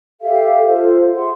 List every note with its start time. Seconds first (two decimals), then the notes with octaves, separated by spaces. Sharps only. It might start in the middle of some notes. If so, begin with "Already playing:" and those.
0.22 G4 A4 E5 F5
0.67 F4 A4 C5
1.15 G#4 E5 F#5 C6